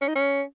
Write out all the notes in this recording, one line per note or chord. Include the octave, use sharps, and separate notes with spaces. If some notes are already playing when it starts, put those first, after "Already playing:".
C#4
D#4
C#4